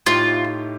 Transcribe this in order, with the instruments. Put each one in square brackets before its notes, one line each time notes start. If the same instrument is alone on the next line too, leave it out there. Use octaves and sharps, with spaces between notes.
[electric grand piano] A2 A3 D#4 G4 [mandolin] F4